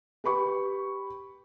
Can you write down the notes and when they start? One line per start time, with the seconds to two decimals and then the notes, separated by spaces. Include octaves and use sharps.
0.24 G4 B4 B5 C#6